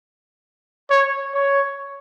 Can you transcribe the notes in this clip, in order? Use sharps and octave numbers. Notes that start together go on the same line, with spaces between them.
C#5
C#5